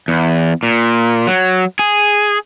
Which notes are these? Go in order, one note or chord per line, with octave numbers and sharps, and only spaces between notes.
E2
A#2
F#3
G#4